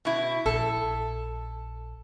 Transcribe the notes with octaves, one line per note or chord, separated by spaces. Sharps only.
B2 E4
A#1 A4